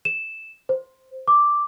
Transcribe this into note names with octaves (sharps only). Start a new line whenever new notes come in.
E7
C5
D6